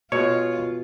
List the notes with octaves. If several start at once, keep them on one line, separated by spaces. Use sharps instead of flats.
B2 G#3 F4 C#5